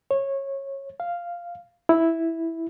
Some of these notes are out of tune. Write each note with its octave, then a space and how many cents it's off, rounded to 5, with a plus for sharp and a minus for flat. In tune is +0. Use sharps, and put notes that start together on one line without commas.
C#5 -20
F5 -5
E4 -5